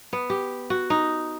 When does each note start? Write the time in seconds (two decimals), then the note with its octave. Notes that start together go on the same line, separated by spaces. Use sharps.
0.13 B3
0.30 G4
0.70 F#4
0.90 D#4